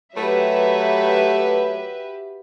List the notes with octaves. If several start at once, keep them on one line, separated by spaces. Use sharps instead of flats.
F#3 A3 G4 B4 E5